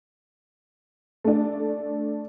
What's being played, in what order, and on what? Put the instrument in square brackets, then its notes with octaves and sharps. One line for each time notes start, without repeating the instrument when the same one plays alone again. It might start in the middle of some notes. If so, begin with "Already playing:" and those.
[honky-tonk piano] A3 D4